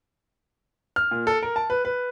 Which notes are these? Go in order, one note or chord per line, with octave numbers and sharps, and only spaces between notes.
F6
A#2
A4
A#4
A5
B4
B4